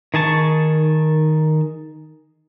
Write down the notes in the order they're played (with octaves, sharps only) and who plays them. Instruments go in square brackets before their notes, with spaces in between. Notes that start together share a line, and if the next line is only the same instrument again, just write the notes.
[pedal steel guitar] D#3 G#4 A5 C#6